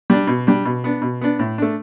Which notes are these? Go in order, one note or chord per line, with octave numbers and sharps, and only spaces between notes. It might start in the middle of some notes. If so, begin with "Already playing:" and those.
G3 D4
B2
G3 D4
B2
B3 D4
B2
B3 D4
A2
A3 D4